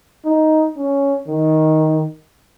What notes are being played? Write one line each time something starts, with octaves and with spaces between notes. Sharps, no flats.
D#4
C#4
D#3